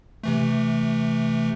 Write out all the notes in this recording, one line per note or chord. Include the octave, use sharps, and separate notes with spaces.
C3 E3 A3